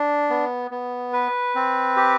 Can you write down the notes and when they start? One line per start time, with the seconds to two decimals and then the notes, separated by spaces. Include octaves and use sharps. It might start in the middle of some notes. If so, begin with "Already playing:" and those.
Already playing: D4
0.30 B3
0.71 B3
1.13 B4
1.55 C4
1.96 G4